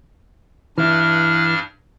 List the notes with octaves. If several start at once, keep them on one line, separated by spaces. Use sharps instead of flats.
G2 E3 D4 E4 F6